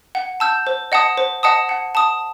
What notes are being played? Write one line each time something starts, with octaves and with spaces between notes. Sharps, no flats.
F#5
A5 E6 G6
C5
D#5 F#5 A5 D#6
C5
D#5 F#5 A5 D#6
F#5
A5 D#6